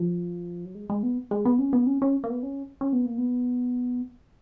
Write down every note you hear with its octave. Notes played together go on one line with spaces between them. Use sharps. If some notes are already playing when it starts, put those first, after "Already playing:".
Already playing: F3
F#3
G#3
G#3
B3
G#3
B3
C#4
B3
C#4
C#4
A#3
B3
C#4
C#4
B3
A#3
B3